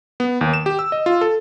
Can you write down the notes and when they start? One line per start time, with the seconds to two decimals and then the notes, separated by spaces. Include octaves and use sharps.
0.20 B3
0.41 D#2
0.54 E7
0.66 G4
0.79 E6
0.92 D#5
1.06 F4
1.21 A4